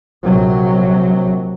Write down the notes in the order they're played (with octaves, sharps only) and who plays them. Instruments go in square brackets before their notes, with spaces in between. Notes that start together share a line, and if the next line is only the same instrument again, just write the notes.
[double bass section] A#1 C3 F#3